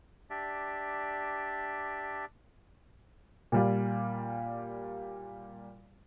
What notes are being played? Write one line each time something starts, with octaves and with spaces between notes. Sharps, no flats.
D4 G4 D5 E5
A#2 G3 F4